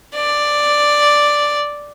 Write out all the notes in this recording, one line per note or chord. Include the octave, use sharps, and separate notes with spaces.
D5